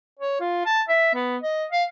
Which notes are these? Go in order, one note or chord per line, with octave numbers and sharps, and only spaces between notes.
C#5
F4
A5
E5
B3
D#5
F5